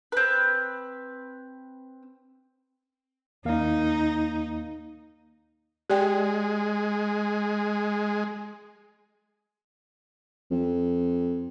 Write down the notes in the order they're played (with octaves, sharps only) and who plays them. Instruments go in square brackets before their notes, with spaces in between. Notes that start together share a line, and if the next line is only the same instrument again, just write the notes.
[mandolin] C4 B4
[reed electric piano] D#2 A#3 F5 [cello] D#4
[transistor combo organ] G#3 [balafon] G4 D5 G5
[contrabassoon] F2